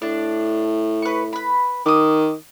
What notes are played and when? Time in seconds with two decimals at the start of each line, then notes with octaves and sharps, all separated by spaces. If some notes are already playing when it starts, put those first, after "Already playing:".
0.02 A2 D4
1.02 B4 C#6
1.33 B4 B5
1.86 D#3 D6 D#6